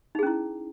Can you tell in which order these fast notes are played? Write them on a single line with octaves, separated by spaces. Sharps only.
D#4 G#4 C#4 E4